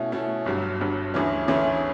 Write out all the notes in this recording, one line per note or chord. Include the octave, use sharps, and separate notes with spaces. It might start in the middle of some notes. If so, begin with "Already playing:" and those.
Already playing: B2 A3 C#4 E4
B2 A3 C#4 E4
G1 G2 F#3
G1 G2 F#3
D2 C#3 E3 A3 C#4
D2 C#3 E3 A3 C#4